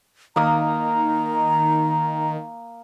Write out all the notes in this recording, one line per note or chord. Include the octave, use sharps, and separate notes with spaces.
D#3 A#3 A#5 D#6